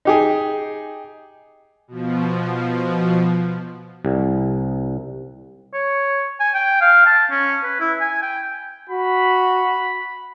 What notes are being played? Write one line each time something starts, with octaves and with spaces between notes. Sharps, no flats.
D#4 G4 G#4
B2 F3
C2
C#5
G#5
G5
F5
A5
C#4
B4
E4
G#5
G5
F#4 B5